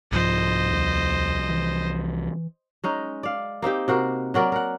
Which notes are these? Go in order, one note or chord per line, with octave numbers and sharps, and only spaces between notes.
C2 G#2 F3 C5 D#5
D#2
E3
G#3 C#4 D#4
D5 F5
A#3 C4 D#4 G4
C3 F#4 A#4 C5
F#3 F#4 A#4 D5
A#4 F#5